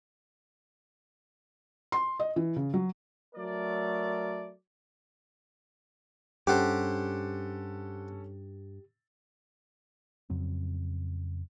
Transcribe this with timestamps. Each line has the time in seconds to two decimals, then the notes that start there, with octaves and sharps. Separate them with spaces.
1.92 C6
2.20 D#5
2.36 E3
2.56 C#3
2.74 F#3
3.35 F#3 A3 A#4 D5
6.47 G2 C#4 G4 A4 C5 F#5 D6
10.30 F2 C#3 F#3 C4